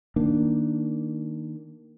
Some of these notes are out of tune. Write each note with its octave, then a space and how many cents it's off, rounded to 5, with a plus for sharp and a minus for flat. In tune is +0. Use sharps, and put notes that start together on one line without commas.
D#3 +0 A#3 +0 D4 +0